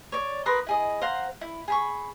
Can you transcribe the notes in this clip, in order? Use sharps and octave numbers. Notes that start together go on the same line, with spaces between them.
C#5 D5
A#4 B4 C6 D#6
E4 G#4 D#5
C5 F5 F#5 A#5
E4
G#4 B5 C#6